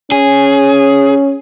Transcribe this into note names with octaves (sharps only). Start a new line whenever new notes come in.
C#4 G#4